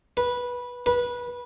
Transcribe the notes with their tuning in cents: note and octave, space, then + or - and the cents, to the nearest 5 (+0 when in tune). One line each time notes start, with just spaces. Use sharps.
B4 -15
B4 -20